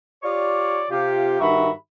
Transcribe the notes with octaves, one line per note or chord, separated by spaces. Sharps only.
F4 G4 C#5 D5
C3 F4 G4
G2 D#3 F#4 E5 A#5 B5